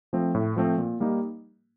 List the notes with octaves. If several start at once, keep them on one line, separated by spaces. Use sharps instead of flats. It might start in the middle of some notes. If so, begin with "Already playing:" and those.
F3 A3 C4
A2
F3 A3 C4
A#2
G3 A#3 D#4